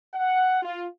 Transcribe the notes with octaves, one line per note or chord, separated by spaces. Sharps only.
F#5
F4